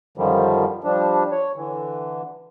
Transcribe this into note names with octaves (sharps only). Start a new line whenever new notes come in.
F#2 D3 D#3 F3 G3
F3 G3 D4
C#5
D3 E3